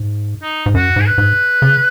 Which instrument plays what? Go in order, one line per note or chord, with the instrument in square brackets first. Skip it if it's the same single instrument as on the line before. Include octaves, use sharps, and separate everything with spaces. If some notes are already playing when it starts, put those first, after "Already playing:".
Already playing: [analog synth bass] G#2
[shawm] D#4
[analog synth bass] G#2
[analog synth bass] F#2 [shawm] F#4
[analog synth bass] G#2 [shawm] G#4
[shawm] B4
[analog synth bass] G#2
C#3